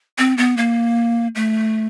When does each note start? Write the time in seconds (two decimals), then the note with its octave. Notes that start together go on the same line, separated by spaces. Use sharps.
0.18 C4
0.37 B3
0.57 A#3
1.35 A3